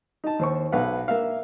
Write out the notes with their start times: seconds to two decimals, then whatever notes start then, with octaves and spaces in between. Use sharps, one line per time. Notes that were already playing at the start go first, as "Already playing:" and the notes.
0.24 D#4 A5
0.39 D#2 C5 C#6
0.72 B1 B4 F5 F#5
1.08 A#3 E5 F5